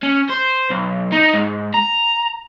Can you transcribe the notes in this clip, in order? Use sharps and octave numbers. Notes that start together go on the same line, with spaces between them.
C#4
C5
B1
D#4
G#2
A#5